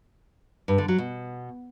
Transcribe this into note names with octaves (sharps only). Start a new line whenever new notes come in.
G2
D3
F#3
B2